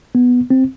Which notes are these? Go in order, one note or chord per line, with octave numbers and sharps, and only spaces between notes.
B3
C4